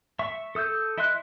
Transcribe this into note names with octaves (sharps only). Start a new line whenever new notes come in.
E5 C#6
A4 D#6 E6 G6
E4 D#5 E5 C6 F#6